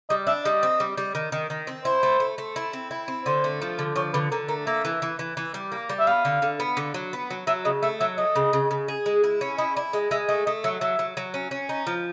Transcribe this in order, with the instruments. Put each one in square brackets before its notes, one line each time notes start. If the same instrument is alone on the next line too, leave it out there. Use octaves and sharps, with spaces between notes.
[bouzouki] G3 [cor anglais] D#5
[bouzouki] D4 [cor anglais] E5
[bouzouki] G3 [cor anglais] D#5
[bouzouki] C4
G3
G3
D#3
D#3
D#3
C4
[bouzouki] E4 [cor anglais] C5
[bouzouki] A3
A3
A3
E4
C4
E4
C4
[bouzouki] D3 [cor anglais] C5
[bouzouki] A3
F3
D3
[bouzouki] F3 [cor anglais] C#5
[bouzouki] D3 [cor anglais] B4
[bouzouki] D3 [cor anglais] A#4
[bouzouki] A3 [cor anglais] A#4
[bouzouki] A#3 [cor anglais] E5
[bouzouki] E3
E3
E3
E3
G3
A#3
G3
[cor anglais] E5
[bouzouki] B3 [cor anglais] F5
[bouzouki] D3
D3
B3
D3
F#3
B3
F#3
[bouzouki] F#3 [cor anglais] E5
[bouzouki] C#3 [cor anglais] D#5
[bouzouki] A3 [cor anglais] E5
[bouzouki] F#3 [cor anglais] E5
[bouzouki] A3 [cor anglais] D#5
[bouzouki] C#3
C#3
C#3
G#4
G#3
E4
C#4
[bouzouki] E4 [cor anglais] D#5
[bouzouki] E4 [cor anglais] D5
[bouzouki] G#3 [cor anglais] D#5
[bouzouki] G#3 [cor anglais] E5
[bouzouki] A3 [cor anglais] D#5
[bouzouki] A3 [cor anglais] D#5
[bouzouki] F#3 [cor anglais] E5
[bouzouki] F#3 [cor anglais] E5
[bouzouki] F#3
F#3
C#4
C#4
D#4
F3